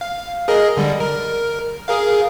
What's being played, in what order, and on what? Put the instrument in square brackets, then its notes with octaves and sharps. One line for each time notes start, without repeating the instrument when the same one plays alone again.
[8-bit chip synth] F5
G#4 A#4 D#5
D3 G3
A#4
G#4 A#4 F5